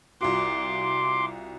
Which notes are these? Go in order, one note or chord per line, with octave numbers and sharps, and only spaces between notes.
C2 F4 F#4 C6 D6